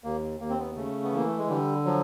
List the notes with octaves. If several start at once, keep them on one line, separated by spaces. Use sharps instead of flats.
D#2 A#3
D#2 A#3
C4
B3
C#3 A3
B3
E3 A#3
A3
G#3
D3 G3
F3 F#3